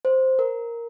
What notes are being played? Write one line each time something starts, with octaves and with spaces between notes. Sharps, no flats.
C5
A#4